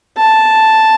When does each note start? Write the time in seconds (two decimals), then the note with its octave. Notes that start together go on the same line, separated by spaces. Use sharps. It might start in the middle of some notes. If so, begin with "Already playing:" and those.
0.18 A5